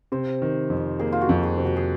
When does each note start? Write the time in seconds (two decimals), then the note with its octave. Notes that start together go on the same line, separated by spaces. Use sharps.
0.12 C3 C5
0.42 D#3
0.70 F2
0.99 A#3 G#4
1.12 F4
1.21 F#4
1.29 F2
1.43 G#4
1.58 C3
1.65 F#4
1.76 G#4